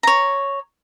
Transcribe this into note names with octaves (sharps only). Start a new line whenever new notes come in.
C#5 A#5